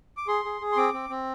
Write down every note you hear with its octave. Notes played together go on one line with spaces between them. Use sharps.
D6
G#4 C6
G#4
G#4
C6
C4 D6
C4
C4